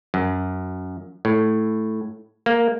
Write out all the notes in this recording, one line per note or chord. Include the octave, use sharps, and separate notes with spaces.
F#2
A2
A#3